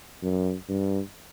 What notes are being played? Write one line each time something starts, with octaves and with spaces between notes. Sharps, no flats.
F#2
G2